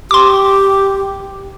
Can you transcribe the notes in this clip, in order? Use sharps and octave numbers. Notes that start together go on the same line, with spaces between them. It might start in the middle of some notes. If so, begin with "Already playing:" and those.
G4 C6 D6